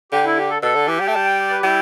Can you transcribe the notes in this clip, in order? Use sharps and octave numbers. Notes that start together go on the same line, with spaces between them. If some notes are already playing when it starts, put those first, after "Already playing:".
D3 G4
E4
G4
A4
B2 A4
D3
E3 G4
G3
A3 G5
G3 A5
G5
D5
B4
G4
G3 E4